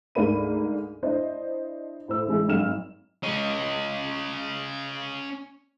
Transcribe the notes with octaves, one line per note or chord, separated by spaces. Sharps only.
D2 G#2 A#3 D5 B5 D#7
D4 E4 C5 D#5
A2 C5 E6
A2 C#3 E3 G#3
G#1 G2 F#3 F6 E7
C#4 D#5